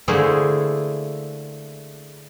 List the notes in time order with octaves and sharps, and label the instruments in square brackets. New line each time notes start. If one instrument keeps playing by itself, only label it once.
[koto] D3 A3 A#3 E4 G#4 C5